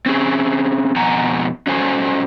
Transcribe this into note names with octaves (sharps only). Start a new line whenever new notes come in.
C4 C#4 G#4
F2 B2 F#5 G#5 A#5
C#4 F#4 A4 C5 G#5